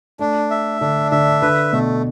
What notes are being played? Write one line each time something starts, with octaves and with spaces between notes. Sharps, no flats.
A3 D4
E5
D3 D4
D3 E5
D3 B4
B2 A3